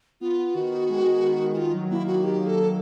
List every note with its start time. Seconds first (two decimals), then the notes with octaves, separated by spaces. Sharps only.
0.21 B3 F4
0.38 B3
0.55 D#3 F#4
0.71 D#3
0.89 G#3
1.06 D#3
1.23 D#3
1.40 D#3
1.53 E4
1.57 D#3 F4
1.74 F#3
1.90 A#3 E4
2.07 D#3 F#4
2.23 D#3 G4
2.41 A#3
2.47 A4
2.58 F#3